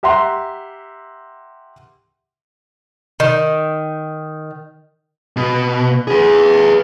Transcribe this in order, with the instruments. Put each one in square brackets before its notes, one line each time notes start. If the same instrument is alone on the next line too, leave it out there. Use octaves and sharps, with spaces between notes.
[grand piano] G4 E5 F#5 A#5 C6
[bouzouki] D#3
[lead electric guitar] B2
G#4 B4